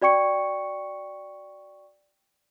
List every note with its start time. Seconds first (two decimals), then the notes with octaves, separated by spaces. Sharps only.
0.02 F#4 D5 G5 C#6 C#7